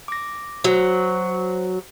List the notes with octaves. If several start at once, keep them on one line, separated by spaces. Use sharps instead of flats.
D6 A#6
F#3 F#4 C5